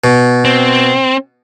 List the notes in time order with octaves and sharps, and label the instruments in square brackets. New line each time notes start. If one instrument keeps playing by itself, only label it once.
[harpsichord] B2
[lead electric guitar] C4